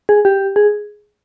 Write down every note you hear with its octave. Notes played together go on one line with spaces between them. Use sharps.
G#4
G4
G#4